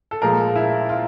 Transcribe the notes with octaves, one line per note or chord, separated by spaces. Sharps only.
A4
A#2 F3 G#3 A#4
E4
F4